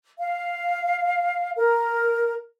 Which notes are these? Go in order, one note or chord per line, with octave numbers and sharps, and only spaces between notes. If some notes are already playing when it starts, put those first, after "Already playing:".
F5
A#4